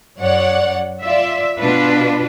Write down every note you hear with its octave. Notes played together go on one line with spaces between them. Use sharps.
F#2 C#5 D5 F#5
F4 D5 E5
B2 D4 F4 B4